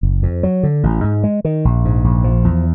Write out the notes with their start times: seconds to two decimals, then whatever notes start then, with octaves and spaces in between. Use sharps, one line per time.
0.03 F#1
0.23 F2
0.43 F#3
0.63 D3
0.83 A1
1.04 G#2
1.24 G#3
1.45 D#3
1.65 A#1
1.85 G#2
2.04 A#1
2.24 F3
2.44 E2